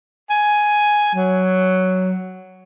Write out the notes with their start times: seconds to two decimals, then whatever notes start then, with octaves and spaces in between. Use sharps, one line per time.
0.30 G#5
1.15 F#3